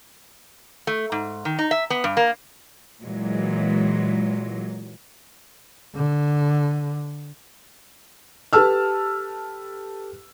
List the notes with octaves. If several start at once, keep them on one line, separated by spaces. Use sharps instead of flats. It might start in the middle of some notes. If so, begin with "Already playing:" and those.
A3
G#2
D#3
D#4
E5
B3
G2
A#3
A#2 E3 F#3 G#3
D3
G4 A4 B4 A5 E6 F6